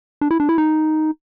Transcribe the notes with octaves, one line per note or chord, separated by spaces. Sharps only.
D4
E4
D4
E4
D#4